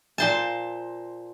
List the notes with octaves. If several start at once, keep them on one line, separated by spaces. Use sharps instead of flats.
A#2 C5 A5